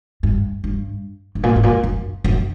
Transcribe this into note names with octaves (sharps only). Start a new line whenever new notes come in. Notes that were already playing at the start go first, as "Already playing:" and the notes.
G2
G2
G2
A#2
G2
A#2
F#2
F#2